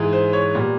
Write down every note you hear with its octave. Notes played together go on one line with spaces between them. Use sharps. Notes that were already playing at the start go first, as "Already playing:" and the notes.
Already playing: G#2 E3 G#3
C5
C#5
A#2 G3 B3